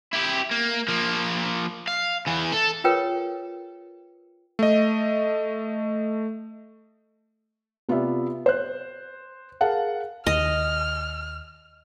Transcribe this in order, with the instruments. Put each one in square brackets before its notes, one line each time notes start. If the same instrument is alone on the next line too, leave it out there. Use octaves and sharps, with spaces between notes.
[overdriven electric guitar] E4 G4
A#3
F3 A#3
F5
E2 E3
A4
[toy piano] F4 G#4 A#4 B4 C#5 G5
[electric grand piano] A3 D#5
[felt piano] C3 B3 F4 G4 D5 E5
C5 F#6
G#4 A#4 F5 F#5 A5
[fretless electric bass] D#2 [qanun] D#5 [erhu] F6